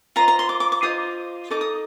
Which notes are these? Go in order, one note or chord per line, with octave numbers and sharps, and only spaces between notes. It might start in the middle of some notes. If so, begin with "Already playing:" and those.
F4 C5 D#5 A#5
A#5
C6
D6
D6
D6
F4 C5 D#5 D#6
D#4 A4 D#5 D6
D#6